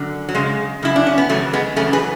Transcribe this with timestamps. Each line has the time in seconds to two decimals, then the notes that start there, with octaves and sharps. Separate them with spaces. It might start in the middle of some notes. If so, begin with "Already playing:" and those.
Already playing: F#2 D3
0.29 F#3
0.35 F#2 C#3 G#3
0.82 F#2 C#3 E4
0.96 D4
1.07 C#4
1.18 B3
1.29 F#2 C#3 E3 F#3 A3
1.53 G#3 B3
1.76 F#2 C#3 E3 A3 C#4
1.93 G#4 B4